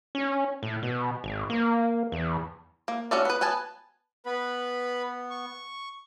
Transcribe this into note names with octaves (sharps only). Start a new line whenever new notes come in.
C#4
A2
B2
G#1
A#3
E2
A#3
C#4 D4 F#4 A4 D5
B3 B4
B3 B4 G#5 A5
B3 B4 B5
C#6